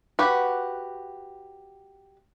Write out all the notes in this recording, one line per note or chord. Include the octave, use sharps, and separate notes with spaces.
F#4 G4 B4